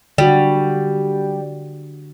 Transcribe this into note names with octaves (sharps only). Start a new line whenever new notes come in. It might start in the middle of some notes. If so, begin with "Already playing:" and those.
D3 G3 F#4